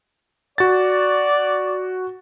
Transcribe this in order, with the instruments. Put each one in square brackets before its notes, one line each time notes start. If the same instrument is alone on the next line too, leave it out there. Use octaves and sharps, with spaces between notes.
[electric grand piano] F#4 A6 [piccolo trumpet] D5